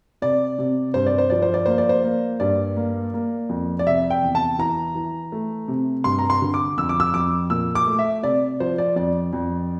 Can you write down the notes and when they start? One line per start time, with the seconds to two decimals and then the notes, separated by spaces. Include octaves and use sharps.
0.22 C3 D5
0.59 C3
0.94 G2 C5
1.06 D5
1.18 C5
1.30 F3 D5
1.42 C5
1.54 D5
1.66 A#3 C5
1.78 D5
1.89 C5
2.04 A#3
2.40 G2 D5
2.77 A#3
3.14 A#3
3.49 F2
3.79 D5
3.86 C3 E5
4.10 G5
4.23 E2
4.35 A5
4.59 E3 A#5
4.95 E3
5.32 A3
5.68 C3
6.04 G2 C6
6.19 A#5
6.30 C6
6.42 D3
6.54 D6
6.77 F2 E6
6.89 D6
7.00 E6
7.14 F2 D6
7.50 A#2 E6
7.75 D6
7.87 A3
7.99 E5
8.23 C3 D5
8.60 F3 C5
8.78 D5
8.96 F2 D5
9.33 F2